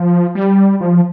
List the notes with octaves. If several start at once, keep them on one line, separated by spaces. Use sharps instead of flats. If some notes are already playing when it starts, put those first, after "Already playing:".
Already playing: F3
G3
F3